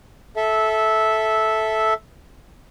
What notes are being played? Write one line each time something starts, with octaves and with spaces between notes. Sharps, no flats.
A4 E5